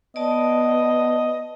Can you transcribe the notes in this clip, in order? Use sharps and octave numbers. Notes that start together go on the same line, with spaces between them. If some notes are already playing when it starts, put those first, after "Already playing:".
B3 D5 D#5 A5